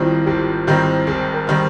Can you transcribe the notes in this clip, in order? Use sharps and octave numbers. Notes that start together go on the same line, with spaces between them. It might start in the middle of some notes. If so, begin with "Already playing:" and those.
Already playing: G#1 G#2 D#3 G3 C4 E4 F4
G#1 G4
G#2 D#3 G3 C4 G4
G#1 G#4
A#4
D#3 G3 C4